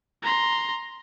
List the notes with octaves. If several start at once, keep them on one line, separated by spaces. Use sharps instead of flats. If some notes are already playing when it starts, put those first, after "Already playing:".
A#5 C6